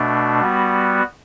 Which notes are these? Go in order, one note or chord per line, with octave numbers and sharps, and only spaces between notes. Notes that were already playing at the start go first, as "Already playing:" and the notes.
Already playing: B2 A3 D4
G3 B3 F#4